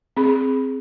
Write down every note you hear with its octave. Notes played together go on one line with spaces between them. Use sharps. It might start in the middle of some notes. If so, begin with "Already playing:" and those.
C4 G#4 B5